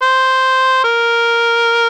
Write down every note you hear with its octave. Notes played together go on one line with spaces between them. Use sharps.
C5
A#4